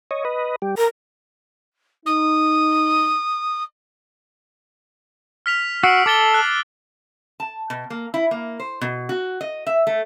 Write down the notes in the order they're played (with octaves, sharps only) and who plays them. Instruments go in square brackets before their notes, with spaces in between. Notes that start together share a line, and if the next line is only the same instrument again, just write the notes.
[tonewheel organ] C#5 D#5
B4 D#5
G3 G4
[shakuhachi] A#4 [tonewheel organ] A#5
[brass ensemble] D#4 [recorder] D#6
[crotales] F6 B6 F7
[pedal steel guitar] F#4 [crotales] E6 C7 D7
[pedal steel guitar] A4 [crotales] D6 A6 G7
[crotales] F#6
[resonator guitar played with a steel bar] A5
B2
A#3
E4
A#3
C5
B2
F#4
D#5
E5
A3